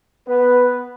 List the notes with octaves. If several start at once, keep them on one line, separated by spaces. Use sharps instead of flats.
B3 B4